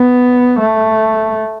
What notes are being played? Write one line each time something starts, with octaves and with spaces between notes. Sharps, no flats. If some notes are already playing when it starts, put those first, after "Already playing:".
Already playing: B3
A3